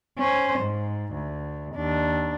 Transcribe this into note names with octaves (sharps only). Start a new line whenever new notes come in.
C#4 C5
G#2
D2
D#2 D4